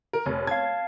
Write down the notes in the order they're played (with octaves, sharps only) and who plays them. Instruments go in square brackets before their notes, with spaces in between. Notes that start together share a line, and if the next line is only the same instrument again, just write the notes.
[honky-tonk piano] A#4
[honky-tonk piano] F1 [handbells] C#5
[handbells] F5 A5 [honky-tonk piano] G#6